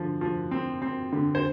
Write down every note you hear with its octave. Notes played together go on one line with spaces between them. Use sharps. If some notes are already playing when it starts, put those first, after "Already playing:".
Already playing: D3 F3
F3
C4
C4
D3
C5